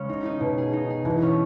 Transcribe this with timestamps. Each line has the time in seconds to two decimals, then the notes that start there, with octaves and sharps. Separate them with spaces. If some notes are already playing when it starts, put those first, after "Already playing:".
Already playing: C#3 G#3 C#4 G#4
0.09 D#4
0.25 D#4
0.40 B2
0.58 G#4
0.73 D#4
0.90 G#4
1.05 B2 E3
1.22 C#4